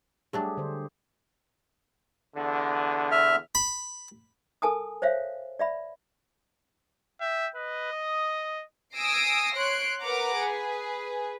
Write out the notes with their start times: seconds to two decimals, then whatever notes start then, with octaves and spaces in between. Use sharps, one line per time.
0.33 F#3 G3 A3 D4 G4 G#4
0.57 D3 C5
2.36 E2 D3
3.11 E5 F6
3.55 B5
4.62 A4 A#4 G#5 A5 D#6
5.02 C5 C#5 E5 F5
5.59 D5 E5 B5
7.21 E5 G5
7.55 B4 D#5
7.93 D#6
8.96 G#5 D#6 E6 A#6 C7 D7
9.56 C#5 C6 F#6 D7
10.02 A#4 B4 F#5 A#5 D6
10.37 G#4 B4